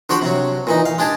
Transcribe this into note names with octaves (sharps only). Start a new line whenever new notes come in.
D3 F3 F#4 G4 C5 B5
C3 F#3
A#2 E3 D#4
F5
G#3 D4 G4 G#4 A5